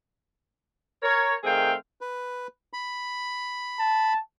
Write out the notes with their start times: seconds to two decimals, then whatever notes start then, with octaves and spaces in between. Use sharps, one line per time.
1.02 A#4 C#5
1.43 D#3 A3 C4 G#4 F5 G5
2.01 B4
2.73 B5
3.80 A5